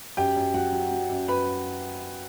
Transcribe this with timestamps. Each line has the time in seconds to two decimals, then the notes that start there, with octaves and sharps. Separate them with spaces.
0.17 F#2 G4 G5
0.36 F#2
0.54 F#3 F#4 F#5
0.72 F#3
0.91 F#3
1.10 F#2
1.28 F#2 B4 B5